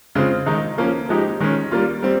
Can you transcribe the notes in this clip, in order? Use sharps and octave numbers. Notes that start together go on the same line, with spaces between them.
C#3 G#3 C4 F4
D#3 G#3 D#4
F3 A#3 C#4
F3 G#3 D#4 G4
D#3 G#3 C#4
G3 A#3 F4
G3 C4